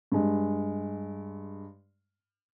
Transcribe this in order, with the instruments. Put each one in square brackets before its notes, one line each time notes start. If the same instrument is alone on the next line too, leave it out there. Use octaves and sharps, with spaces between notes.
[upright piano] G2 G#3